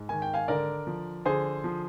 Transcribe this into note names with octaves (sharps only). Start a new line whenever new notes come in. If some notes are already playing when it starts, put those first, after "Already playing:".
Already playing: G#2
D#3 G#5
G5
F5 G#5
D3 A#4 D5
F3
D3 G#4 C5
F3